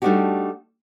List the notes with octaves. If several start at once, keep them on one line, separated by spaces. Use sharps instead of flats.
G3 A3 D4 D#4 F#4 G4